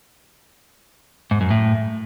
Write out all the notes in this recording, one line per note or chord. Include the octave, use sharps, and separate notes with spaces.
G#2
F#2
A2